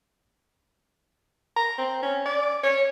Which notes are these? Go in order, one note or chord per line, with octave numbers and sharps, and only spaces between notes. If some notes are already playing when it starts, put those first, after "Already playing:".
A#5
C4
C#4
D5
C#5